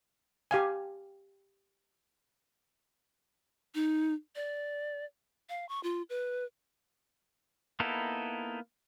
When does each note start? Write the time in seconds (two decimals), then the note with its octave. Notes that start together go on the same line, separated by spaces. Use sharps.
0.51 G4 F5 G#5
3.75 D#4
4.35 D5
5.49 F5
5.69 C#6
5.83 F4
6.10 B4
7.80 A#3 B3 D#4 E4 A4